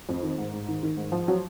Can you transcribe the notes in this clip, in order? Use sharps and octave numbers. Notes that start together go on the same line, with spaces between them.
F2
D#3
G#2
G#2
D#3
D#3
G#2
F3
F#3